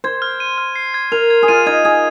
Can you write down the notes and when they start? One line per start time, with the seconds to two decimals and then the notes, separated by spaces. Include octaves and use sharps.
0.04 C5 G#6
0.22 F6
0.40 D#7
0.58 F6
0.76 C7
0.94 G#6
1.12 A#4 F7
1.30 G#6
1.43 G#4
1.48 F4 D#7
1.66 D#4 G#6
1.85 G#4 G#6